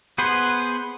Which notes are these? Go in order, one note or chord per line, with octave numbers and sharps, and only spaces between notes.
B3 G#4 B4 C5